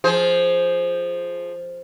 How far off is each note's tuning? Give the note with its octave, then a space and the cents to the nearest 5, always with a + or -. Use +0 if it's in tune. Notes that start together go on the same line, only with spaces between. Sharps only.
F3 +0 G#4 +15 C5 +0